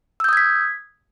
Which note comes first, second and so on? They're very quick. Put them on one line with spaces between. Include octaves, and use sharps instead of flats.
E6 G6 D#6 G#6 B6